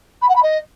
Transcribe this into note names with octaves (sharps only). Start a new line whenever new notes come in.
B5
F#5
B5
D#5